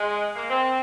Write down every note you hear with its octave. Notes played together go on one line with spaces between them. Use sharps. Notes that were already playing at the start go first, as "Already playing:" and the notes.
Already playing: G#3
A#3
C4